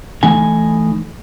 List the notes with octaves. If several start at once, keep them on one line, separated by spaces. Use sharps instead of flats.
E3 A3 D#4 G#5